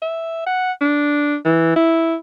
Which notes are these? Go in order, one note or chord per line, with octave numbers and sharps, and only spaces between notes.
E5
F#5
D4
E3
E4